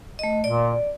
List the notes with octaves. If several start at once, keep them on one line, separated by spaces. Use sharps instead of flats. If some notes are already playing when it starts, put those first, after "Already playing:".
A3 D#5
A#2 D5